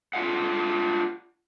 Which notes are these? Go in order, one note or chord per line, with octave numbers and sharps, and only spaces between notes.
D4 F4 E5 F#5